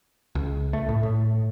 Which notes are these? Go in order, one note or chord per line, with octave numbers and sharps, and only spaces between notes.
C#2
A3
A2
A2